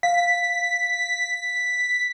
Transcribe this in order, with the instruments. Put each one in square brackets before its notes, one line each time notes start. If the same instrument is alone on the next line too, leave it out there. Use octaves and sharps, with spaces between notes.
[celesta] F5 [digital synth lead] B6